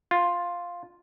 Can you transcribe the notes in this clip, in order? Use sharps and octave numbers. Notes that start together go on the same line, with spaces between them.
F4